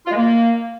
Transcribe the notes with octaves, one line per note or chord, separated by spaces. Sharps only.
F4
G#3
A#3